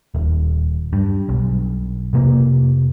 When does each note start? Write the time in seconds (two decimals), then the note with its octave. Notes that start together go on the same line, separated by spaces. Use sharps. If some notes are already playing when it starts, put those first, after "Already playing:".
0.15 D#1
0.93 G2
1.29 B1
2.13 F1 C3 A#3